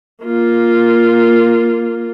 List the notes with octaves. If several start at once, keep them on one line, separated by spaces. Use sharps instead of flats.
A#3 F4